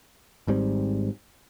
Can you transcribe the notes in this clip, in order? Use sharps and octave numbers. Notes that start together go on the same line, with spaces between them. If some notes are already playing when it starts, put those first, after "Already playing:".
G#1 G#2 G3 C4